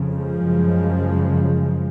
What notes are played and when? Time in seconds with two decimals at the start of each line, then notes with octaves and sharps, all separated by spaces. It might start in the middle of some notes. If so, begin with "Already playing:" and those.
Already playing: F2 C#3
0.10 F3 G#3
0.44 F#2 C#3